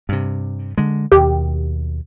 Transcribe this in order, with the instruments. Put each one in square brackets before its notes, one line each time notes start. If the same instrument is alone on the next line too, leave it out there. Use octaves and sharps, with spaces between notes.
[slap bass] G2 C3
D3 G#3
[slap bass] D#2 B2 [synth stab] G4